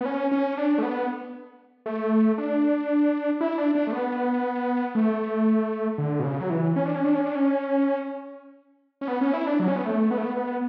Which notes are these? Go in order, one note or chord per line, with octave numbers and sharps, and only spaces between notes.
B3
C#4
C#4
D4
A3
B3
A3
D4
E4
D4
D4
A3
B3
A3
D3
B2
C#3
F#3
E3
C#4
D4
C#4
D4
C#4
D4
C#4
C#4
B3
C#4
E4
D4
F#3
C#4
B3
A3
B3
A3
B3
B3